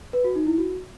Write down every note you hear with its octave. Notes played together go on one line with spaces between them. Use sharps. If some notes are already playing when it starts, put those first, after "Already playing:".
B4
F#4
D#4
E4
F#4